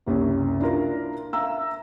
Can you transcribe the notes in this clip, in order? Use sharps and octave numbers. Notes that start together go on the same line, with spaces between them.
F#1 C2 C#4
D4 E4 F4 A#4
E5 F5 A#5 E6